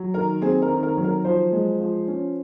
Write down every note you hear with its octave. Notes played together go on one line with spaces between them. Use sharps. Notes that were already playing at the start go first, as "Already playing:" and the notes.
Already playing: F#3
D#3 A#4
C4 G#4
A#4
D#3
A#4
F#3
A#4
F3 C5
G#3
F3
C#4